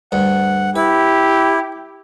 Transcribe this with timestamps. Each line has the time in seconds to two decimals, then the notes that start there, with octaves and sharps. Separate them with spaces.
0.12 D2 G2 F#5
0.76 E4 G4 B4